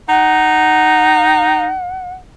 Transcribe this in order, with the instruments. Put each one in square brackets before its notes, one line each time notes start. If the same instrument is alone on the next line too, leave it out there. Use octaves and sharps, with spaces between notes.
[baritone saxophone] D#4 [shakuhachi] F#5